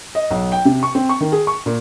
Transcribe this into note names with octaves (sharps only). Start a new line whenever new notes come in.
D#5
B1
G5
C3
C#6
C4
C#6
D#3
G#4
C#6
A#2